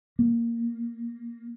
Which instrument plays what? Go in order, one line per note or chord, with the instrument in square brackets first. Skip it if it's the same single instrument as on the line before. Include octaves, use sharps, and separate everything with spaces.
[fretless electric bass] A#3